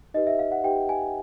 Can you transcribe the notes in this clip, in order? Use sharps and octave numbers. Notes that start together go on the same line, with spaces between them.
D#4 G4 B4 D#5
E5
F5
F#5
D#4 G4 B4 G5
G#5